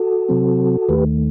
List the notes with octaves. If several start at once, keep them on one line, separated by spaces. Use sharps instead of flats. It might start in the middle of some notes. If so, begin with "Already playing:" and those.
Already playing: F#4 A4
C3 F#3 C4
D#2 D#3 A3 G4 B4